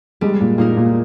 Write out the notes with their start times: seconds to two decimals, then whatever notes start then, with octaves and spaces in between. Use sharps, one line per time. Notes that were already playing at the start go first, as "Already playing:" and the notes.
0.21 G3 G#3
0.41 A#2
0.58 A#2 A#3 D#4 A#4
0.77 A#2